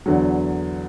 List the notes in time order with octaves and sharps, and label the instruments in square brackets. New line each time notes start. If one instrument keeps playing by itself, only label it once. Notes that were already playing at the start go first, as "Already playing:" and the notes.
[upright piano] E2 D3 F#3